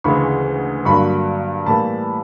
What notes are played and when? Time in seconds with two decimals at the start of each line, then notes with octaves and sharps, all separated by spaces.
0.04 D2 C#3 E3 G#3 B5 C#6
0.85 G2 D3 F#3 A#3 B5 C#6
1.66 A2 E3 G3 A#3 A5 B5